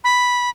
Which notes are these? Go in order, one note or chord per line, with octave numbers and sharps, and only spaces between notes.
B5